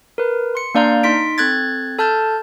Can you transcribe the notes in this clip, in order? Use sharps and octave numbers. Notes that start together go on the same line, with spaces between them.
A#4 B4
C6 C#7
A#3 D4 D5 F5 A#5 G6
D#4 C6 B6 D7
C4 A4 F#6 G#6 A6
A4 A5 F6 G6 A6